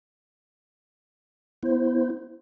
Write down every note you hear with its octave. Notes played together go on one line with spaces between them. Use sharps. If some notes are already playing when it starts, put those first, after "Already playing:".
B3 E4 C5